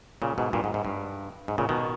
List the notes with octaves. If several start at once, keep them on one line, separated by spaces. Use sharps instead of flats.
A#2 C#3
G#2 B2
G2 A#2
G#2
G#2
G2
G#2
A#2 C#3
B2 D#3